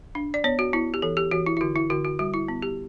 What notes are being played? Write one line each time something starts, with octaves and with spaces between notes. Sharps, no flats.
D4
D5
B3 C#5
F#4
B3 E4
G4
E3 A4
G4
E3 F#4
E4
E4
D3 F#4
E4
D3 F#4
F#4
G3 F#4
E4
B3
G4